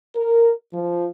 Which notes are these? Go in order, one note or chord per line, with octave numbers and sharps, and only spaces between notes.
A#4
F3